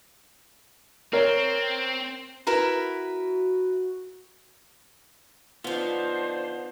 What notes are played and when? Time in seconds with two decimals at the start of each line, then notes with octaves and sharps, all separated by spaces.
1.13 C4 A#4 C#5
2.47 E4 F#4 A#4 B4
5.64 D3 F3 B3 D4 D#4 F4 C5